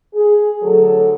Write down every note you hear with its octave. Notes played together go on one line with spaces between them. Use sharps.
G#4
D2 F#3 A4